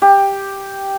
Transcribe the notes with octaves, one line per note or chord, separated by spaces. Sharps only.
G4